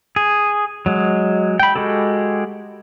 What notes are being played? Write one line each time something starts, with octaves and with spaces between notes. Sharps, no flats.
G#4
F#3 G#3
G5 B5
G#3 F#4 G4 A4